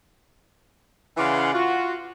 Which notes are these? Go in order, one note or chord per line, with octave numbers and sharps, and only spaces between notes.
C#3 E3 D5 F5 F#5 C6
F4 F#4